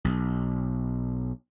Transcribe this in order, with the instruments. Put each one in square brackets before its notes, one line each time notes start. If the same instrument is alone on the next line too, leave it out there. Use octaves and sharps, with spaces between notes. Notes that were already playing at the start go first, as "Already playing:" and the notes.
[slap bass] B1